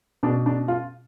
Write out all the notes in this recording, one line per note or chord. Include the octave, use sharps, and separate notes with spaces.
B2 D4
D4
F4